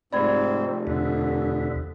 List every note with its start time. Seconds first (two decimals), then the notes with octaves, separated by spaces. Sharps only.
0.13 F1 G#2 C4 D5 B5 G#6
0.87 E2 B2 D3